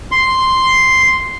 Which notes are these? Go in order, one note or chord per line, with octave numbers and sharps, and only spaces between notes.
C6